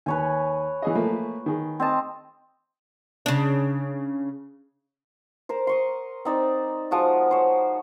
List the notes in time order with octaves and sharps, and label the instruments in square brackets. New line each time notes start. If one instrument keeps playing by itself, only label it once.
[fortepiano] D#2 [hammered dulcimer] B4 C#5 G#5
[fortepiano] E3 G#4 D#5
[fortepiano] F3 A3 A#3 [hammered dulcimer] B4
[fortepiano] D#3 G#4
[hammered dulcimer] C4 D#5 A5
[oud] C#3 D4
[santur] A#4 C5
C6 C#6 D#6
C4 D#4 D5
F3 G#3 F#4
C5 C#5